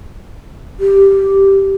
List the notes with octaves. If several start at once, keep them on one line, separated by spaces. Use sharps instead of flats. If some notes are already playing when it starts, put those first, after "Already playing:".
G4